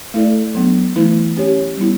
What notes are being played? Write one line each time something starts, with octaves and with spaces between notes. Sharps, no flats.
A3 E4 A4 D5
F#3 B3 D4
E3 A3 E4
C#4 G4 C#5
G3 B3 E4